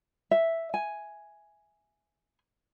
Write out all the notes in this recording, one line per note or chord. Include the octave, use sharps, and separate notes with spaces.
E5
G#5